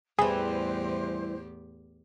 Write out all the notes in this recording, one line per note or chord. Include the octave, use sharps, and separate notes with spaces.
E2 A2 E3 G3 G4 G#4 C5